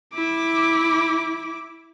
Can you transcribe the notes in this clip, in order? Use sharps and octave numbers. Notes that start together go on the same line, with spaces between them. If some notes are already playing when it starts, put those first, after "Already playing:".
E4 D6